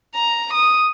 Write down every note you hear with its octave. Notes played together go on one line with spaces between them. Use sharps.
A#5
D#6